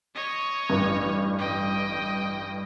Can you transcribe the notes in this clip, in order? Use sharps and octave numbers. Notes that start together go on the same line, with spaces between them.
C#5 D#5
A1 G2
D#5 G5